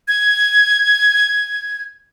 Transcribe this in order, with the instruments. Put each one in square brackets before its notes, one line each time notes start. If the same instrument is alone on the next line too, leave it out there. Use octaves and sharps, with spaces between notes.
[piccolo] G#6